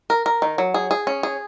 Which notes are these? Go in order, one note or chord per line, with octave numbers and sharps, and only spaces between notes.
A#4
A#4
D#3
F#3
G#4
G#4
C#4
G#4